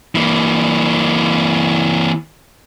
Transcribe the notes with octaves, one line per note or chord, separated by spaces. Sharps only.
E3 A#3